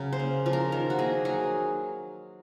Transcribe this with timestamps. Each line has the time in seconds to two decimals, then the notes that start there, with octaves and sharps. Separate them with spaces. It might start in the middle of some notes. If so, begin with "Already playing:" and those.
Already playing: C#3 F#3 A#4
0.13 C5
0.19 A#3
0.46 F3
0.53 A#4
0.72 D#3 A#4
0.90 F#4
0.99 A#3 G#4
1.25 F#3 G#4